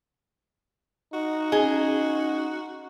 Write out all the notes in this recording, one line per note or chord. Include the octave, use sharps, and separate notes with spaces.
D#4 F#4
C#4 G#4 D#5